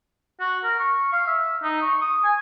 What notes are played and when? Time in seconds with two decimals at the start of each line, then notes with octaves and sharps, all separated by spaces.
0.41 F#4
0.64 A#4
0.79 C#6
1.13 F5
1.27 E5
1.64 D#4
1.82 C#6
2.02 D#6
2.24 G#5